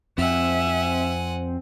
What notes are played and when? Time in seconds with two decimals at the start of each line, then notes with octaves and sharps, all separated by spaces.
0.18 F2 C4 E5 F#5 G#5